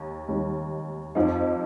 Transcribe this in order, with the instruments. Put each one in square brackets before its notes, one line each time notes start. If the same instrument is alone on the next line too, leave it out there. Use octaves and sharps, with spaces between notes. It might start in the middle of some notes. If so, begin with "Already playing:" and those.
Already playing: [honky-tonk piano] D#2
D#2 D#3 G3
F2 F3 D#4